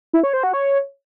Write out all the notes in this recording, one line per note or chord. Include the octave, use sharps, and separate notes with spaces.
E4
C#5
C5
F#4
C#5